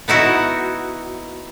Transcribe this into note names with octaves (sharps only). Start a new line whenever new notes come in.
B3 D#4 E4 F#4